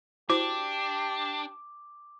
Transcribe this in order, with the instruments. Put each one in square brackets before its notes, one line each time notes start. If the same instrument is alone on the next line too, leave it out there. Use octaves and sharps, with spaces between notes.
[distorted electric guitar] D4 [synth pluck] E4 F#4 C5 [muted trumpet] G4 [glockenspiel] D6